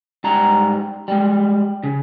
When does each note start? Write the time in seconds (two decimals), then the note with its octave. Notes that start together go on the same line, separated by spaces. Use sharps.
0.24 G#2 G3 A#5
1.08 G3 G#3
1.83 C#3